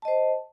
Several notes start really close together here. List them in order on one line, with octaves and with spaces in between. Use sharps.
A5 D#5 C5